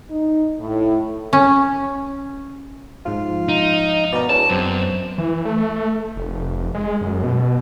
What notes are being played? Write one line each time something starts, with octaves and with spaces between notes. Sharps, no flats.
D#4
A2
C#4
G#2 F3 F4
D#4
B2 A#4 D5
E2 G#3 C#4 D4 A5
F#2 B3 C4
E3
A3
F1
G#3
F#2
B2